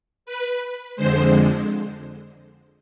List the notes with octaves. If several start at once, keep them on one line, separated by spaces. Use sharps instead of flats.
B4
F2 D3 G#3 C5